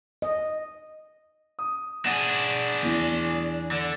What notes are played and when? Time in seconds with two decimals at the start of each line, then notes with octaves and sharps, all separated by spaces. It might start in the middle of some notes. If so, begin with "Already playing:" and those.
0.22 D#5
1.59 D#6
2.06 D4 G#4 F#5
2.83 E2 E3
3.71 D3